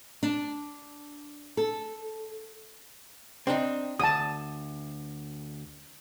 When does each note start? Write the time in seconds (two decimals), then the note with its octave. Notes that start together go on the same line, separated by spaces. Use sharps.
0.23 D4
1.57 A4
3.47 C4 D4 D#4
3.99 D2 A5 D#6